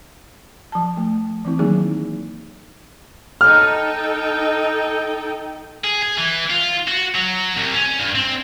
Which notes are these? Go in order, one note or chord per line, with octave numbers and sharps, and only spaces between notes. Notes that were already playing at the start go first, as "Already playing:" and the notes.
F3 A5
A3
E3 C4 E4
D#3 F#3 A#3 D#4 G#4
D#4 A4 G5 F6
G#4
G#4
E3
F4
F#4
F#3
C2
C#4
G2
C4